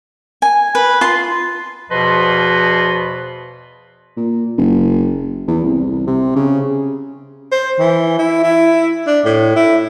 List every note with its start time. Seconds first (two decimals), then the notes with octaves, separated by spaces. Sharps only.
0.42 G#5
0.75 B4
1.01 F4 C6
1.91 E2 B2 F3 B4 D#5 C6
4.17 A#2
4.58 F#1
5.47 E2
5.64 C2
6.07 C3
6.36 C#3
7.52 C5
7.79 E3
8.19 E4
8.43 E4
9.07 D4
9.25 A2
9.56 E4